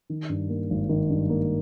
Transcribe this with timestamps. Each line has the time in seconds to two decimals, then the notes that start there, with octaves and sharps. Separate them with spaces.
0.10 D#3
0.29 G2
0.49 A#3
0.70 G#1
0.89 D#3
1.10 G2
1.30 A#3